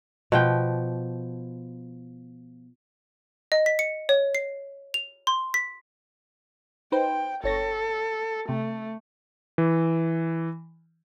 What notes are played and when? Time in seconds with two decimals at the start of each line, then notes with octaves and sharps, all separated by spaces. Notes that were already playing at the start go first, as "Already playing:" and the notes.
0.32 B2 F3 G5
3.52 D#5
3.66 B6
3.79 C#7
4.09 C#5
4.35 C7
4.94 F7
5.27 C6
5.54 B6
6.92 D#4 B4 C5 G5
7.44 G1 A4 C#5 A#6
8.49 C3 A3
9.58 E3